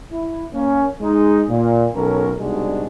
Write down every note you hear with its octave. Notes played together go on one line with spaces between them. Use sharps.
E4
A#3 C#4
G#3 D#4
A#2
B1 C#4 A4 A#4
C2 B2 G#3 D4 D#4 F#4